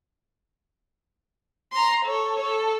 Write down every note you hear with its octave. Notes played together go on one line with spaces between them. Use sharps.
A#5 C6
A4 C#5
A4